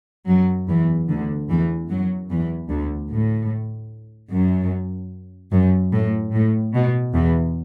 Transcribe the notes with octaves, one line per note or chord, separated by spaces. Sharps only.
F#2 F#3
E2 E3
D2 D3
E2 E3
F#2 F#3
E2 E3
D2 D3
A2
F#2
F#2
A2
A2
B2
E2 E3